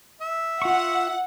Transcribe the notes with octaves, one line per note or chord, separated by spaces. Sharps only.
E5
F4 F#5 C#6